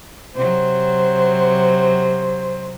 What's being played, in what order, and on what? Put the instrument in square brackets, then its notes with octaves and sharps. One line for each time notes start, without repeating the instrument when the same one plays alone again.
[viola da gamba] C3 F#3 [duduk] C5